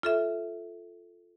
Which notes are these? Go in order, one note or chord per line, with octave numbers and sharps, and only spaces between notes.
F4 A4 E5